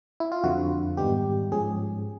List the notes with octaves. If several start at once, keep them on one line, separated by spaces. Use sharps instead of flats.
E4
F4
F2 D3 F3 F#4
G#2 D#3 G3 B3 D#4 G4
G#2 F3 G#3 C#4 G#4